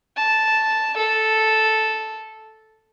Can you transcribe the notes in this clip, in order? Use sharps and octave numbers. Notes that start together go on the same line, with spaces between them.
A5
A4